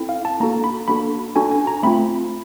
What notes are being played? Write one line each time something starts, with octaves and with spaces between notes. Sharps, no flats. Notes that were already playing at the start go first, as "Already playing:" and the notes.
Already playing: C4 E4 A4
F5
A5
A#3 D4 F#4 A4 A#5
B5
A#3 D4 F#4 A4 B5
D4 F#4 A4 G#5
G#5
A#5
A3 C4 F4 B5